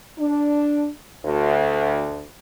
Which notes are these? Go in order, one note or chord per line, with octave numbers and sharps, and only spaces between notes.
D4
D2